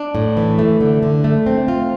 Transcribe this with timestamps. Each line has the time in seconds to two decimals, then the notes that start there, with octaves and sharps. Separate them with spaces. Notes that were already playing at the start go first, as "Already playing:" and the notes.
Already playing: D4
0.15 A2
0.37 E3
0.59 A3
0.81 D3
1.03 D3
1.24 A3
1.46 C4
1.68 F4